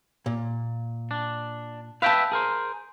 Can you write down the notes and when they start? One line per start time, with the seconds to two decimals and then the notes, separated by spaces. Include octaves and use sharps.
0.26 A#2
1.11 D4
2.02 B4 E5 F5 G5 A5
2.32 G#4 A#4 C5